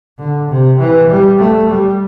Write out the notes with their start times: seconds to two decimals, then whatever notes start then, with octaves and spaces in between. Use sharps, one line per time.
0.19 D3
0.50 C3
0.80 E3
1.09 G3
1.39 A3
1.69 G3